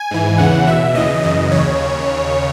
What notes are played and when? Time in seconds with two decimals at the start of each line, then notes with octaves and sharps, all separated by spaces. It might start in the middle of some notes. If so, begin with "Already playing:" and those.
Already playing: G#5
0.11 G#2 E3
0.38 E2 C#3 E3 F#5
0.66 E2 B2 E5
0.94 D#2 C#3 E3 D#5
1.23 F#2 C#3 E3 D#5
1.51 D#2 C#3 E3 C#5